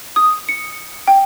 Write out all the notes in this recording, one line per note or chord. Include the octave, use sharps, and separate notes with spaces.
D#6
C#7
G5